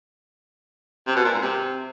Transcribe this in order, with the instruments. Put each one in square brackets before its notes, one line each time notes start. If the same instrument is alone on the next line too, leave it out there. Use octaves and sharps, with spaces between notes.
[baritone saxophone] C3
B2
A#2
G#2
C3